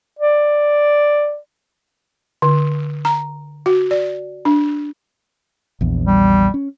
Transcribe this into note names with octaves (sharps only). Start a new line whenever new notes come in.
D5
D3
A#5
F#4
D5
D4
A#1 E2
G3
C#4